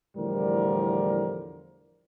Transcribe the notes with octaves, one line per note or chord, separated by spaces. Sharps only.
E2 A2 D3 F3 G3 A#4